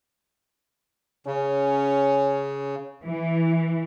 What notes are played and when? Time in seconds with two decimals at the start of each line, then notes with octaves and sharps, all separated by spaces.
1.27 C#3 C#4
3.03 E3